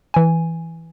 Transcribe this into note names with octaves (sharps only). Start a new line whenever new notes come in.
E3 G#5